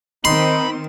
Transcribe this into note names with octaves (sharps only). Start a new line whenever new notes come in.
D#3 C4 D#4 B5 C6